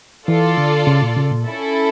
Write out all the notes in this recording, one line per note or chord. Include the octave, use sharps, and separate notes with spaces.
E3 F4 A4 D5
D3
C#3
A#2
C#3
A#2
C#4 E4 A4